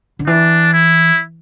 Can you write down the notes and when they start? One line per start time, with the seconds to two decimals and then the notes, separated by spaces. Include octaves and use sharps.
0.19 D3
0.27 E3 D4
0.73 E4